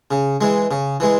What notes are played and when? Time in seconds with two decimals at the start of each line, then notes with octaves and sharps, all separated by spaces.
0.11 C#3
0.41 E3 G#3
0.71 C#3
1.00 E3 G#3